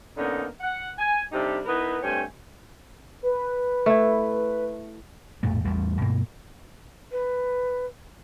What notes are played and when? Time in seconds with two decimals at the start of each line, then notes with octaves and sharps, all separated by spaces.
0.17 D3 A#3 B3 C#4 D#4
0.60 F#5
0.98 G#5
1.32 C3 G3 D4 D#4 G4 A4
1.66 B3 D#4 E4 A#4 B4
2.02 G2 A3 C4 C#5 G5 G#5
3.23 B4
3.86 A3 E4
5.43 A#1 F2 A2 A3
5.65 A1 E2 G3 A3
6.01 G2 B2 A#3
7.12 B4